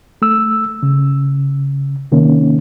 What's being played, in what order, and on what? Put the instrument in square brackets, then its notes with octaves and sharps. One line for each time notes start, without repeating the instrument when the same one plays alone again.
[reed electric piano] A3 E6
C#3
C3 D#3 A#3 C#4